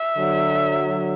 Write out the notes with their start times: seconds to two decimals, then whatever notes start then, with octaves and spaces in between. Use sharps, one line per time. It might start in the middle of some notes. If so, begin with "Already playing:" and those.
Already playing: E5
0.17 D3 F#3